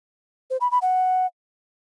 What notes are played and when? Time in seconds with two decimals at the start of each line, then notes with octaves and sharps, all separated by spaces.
0.50 C5
0.61 B5
0.71 B5
0.82 F#5